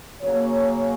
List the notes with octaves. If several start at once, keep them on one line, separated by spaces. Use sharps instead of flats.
C#3 F#3 A#3 C#5